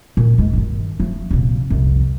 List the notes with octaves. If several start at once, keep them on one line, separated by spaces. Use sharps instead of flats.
A#2
D#2 G#3
G2 D#3
F3 A3
F1 A#2
C2 F2